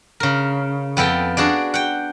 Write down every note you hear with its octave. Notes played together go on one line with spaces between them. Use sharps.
C#3 A#4
F2 B3 A4 G5
D4 F#4 G#4 D5
F#5 G5